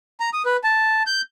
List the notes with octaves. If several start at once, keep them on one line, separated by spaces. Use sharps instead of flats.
A#5
D#6
B4
A5
G6